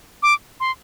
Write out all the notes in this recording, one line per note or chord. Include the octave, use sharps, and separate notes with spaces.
D6
C6